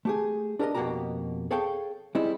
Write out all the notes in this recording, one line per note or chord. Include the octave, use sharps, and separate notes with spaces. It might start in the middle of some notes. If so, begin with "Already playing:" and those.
A3 G4 G#4
D4 G4 A#4 D5 D#5
F2 B2 A#3 F#4 G4 A#5
G#4 A4 C#5 F5 G5
G3 G#3 C4 D#4 E4